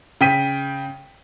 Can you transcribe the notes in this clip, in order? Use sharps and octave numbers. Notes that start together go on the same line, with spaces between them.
C#3 G5 B6 D#7